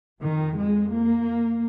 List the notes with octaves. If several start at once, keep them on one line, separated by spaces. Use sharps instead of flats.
F2 D#3
G#3
A#3